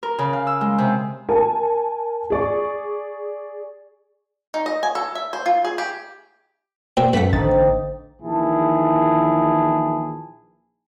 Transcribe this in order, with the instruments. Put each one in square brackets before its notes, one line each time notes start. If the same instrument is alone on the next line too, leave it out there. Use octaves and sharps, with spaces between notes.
[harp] A#4
C#3
F5
E6
G#3
C3
[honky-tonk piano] A#4 G#5 A5
G#4 D5 C#6
[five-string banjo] D#4
D#5
G#5
A4
E5
C5
F4
G#4
G4
[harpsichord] A#2 E5 G5 [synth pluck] C5
[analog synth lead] F#2 [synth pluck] A3 B6 [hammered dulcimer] A#3 [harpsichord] B4 F#5
[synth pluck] A1 A6 [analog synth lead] D3 [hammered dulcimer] C4 D#4
[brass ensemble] A#1 D#3 E3 E4 G#4 A5